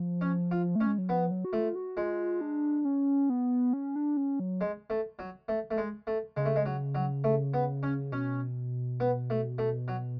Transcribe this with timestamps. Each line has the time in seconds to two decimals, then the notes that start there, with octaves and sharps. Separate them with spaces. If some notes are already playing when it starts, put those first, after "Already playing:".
Already playing: F3
0.21 C#4
0.51 F4
0.76 A3 C#4
0.86 G#3
0.98 F#3
1.09 F3 B3
1.31 F#3
1.45 F#4
1.53 A3 F4
1.75 F#4
1.97 G#3 F4
2.41 D4
2.85 C#4
3.30 B3
3.73 C#4
3.96 D4
4.17 C#4
4.40 F#3
4.61 G#3
4.90 A3
5.19 F#3
5.48 A3
5.71 A3
5.77 G#3
6.07 A3
6.37 C#3 G#3
6.45 A3
6.56 G#3
6.65 F#3
6.95 F#3
7.24 A3
7.54 B3
7.83 C#4
8.12 B2 C#4
9.00 B3
9.30 A3
9.58 A3
9.88 F#3